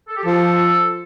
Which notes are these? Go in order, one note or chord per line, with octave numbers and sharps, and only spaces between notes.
A4
G4
F3 A4